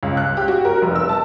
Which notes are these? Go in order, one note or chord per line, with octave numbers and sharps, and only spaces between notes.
C#2
F#6
G4
F#4
A#4
F1
E6
A5